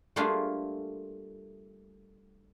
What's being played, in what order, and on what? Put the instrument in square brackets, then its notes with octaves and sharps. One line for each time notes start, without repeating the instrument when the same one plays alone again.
[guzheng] G3 A3 A#3 D4 F4 G#4